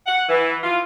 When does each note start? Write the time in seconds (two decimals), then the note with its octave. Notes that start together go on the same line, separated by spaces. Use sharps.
0.06 F#5
0.28 E3
0.63 F4